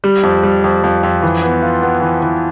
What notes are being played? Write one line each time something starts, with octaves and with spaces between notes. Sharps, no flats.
G3
F2
G3
F2
F2
F2
E3
B3
F4
B3
E3
E3